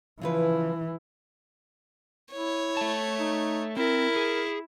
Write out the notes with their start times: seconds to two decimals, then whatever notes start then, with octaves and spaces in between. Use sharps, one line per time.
0.21 C#3 E3 F3 B4
2.32 E4 C#5
2.77 A3 A5
3.19 D#4
3.77 C4 E4 A#4
4.16 G#4